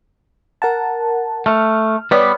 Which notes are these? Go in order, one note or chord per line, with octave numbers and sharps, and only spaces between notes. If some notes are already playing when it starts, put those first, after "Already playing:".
A#4 F#5 A5
A3 F6
G3 B3 B4 C#5 D5